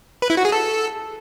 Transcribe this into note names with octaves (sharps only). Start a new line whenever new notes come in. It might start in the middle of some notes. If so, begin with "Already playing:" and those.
B4
E4
F#4
G#4
A4